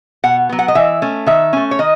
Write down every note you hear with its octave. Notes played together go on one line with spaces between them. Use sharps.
B2 F#5
F#3 B3
F#5
D#5
E3 E5
A3 C#4
D#3 E5
A3 C#4
C#5
D#3 D#5